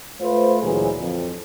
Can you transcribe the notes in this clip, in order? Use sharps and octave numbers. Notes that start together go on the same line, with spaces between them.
A3 F4 B4 C5
D2 A#2 E3 F#3 G#4
F2